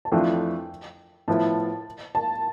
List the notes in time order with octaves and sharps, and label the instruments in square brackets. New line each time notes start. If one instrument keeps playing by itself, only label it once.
[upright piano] A5
[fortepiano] F2 E3 A3 D4 F4 [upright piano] G5
[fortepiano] A2 F3 B3 E4 [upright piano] A5
[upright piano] A5